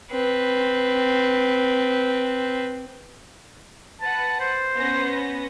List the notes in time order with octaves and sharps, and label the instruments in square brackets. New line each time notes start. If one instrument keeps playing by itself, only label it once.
[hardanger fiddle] C4 B4
[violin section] B4 F#5 [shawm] A5
[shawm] C5
[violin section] B3 C#4 A#6